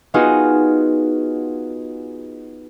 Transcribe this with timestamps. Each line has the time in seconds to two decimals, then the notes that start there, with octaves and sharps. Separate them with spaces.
0.14 B3 D#4 F4 F#4 G#4